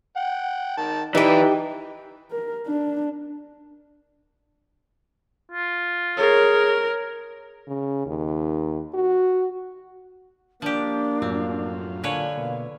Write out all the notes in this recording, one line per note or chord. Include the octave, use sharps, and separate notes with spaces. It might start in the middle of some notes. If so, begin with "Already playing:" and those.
F#5 G5
D#3 A5
E3 D#4 G4 B4 D5 G5
A#4
D4
F4
G#4 A#4 C#5
C#3
D#2
F#4
F3 A#3 D4 G4
F#2 A2 C4 F4
A#2 D3 B4 C#5 F5 G#5
B2 A#3